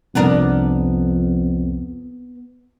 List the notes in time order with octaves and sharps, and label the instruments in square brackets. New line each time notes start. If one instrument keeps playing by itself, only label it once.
[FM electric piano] C2 [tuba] F2 [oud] B3 D4 A#4